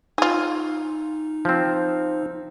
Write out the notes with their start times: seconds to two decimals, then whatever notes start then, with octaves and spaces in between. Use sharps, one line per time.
0.18 D#4 F4 G#4
1.45 F3 C4